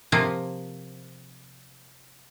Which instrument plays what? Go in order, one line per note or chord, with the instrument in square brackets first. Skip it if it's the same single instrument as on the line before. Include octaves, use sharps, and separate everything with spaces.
[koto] C3 F3 A#3